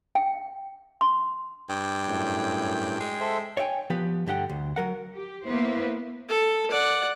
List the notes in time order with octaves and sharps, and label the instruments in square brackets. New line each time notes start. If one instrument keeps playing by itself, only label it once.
[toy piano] G5
C6
[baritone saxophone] G2 [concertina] G5
[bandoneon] F#2 A2
[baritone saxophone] G#3
[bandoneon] A4 C5 E5
[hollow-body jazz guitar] C#5 D5 E5 G5 G#5
F3 B3 G4 B4
G2 D3 G4 F#5 G5
D2
F#3 A#4 F#5
[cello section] G4
A#3 B3 E4 B4 C5
[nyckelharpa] A4
D5 F#5